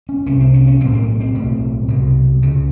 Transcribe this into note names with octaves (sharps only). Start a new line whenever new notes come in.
C#4
C2 C3 C#4
C4
C#4
C#4
B1 A2 C4
A#3
C4
B1 A2
C2 B2
C#2 C#3